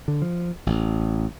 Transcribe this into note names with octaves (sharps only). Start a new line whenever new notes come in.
D3
F3
A1